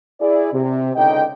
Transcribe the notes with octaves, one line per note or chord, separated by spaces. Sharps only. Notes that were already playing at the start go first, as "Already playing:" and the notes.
E4 G#4 D5
C3
C#2 D3 D#4 D#5 G5